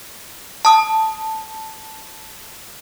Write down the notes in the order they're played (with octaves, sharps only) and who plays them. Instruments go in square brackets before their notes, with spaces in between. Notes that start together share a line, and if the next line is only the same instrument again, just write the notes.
[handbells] A5 D#6